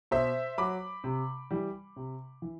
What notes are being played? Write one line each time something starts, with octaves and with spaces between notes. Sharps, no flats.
B2 C5 E5
F#3 B5 D6
C3
E3 G3
C3
E3